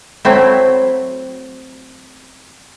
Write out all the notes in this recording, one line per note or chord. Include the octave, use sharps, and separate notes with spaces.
F#3 A3 C4 E4